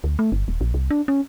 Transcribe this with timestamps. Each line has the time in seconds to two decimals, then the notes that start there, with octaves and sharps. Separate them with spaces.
0.04 D2
0.19 A3
0.32 G1
0.48 D#1
0.61 A#1
0.74 C2
0.91 D4
1.08 C#4